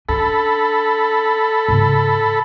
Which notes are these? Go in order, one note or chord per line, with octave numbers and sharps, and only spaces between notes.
C#4 D4 A4 B5
G#2 C#3